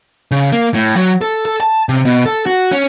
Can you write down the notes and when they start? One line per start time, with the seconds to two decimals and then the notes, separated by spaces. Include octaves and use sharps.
0.31 C#3
0.52 A#3
0.74 A2
0.96 F#3
1.21 A4
1.45 A4
1.60 A5
1.89 C3
2.05 B2
2.26 A4
2.46 F#4
2.72 C#4